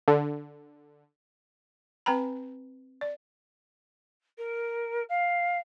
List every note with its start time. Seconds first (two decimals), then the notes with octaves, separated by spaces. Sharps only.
0.08 D3
2.06 C4 B4 G5 A#5 B5
3.01 D5
4.38 A#4
5.09 F5